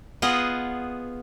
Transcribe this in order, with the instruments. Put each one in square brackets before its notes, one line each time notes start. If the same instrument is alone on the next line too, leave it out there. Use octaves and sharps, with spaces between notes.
[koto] B3 F4 G#4 D#5 F#5